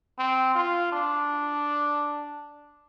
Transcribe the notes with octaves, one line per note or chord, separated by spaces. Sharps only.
C4
F4
D4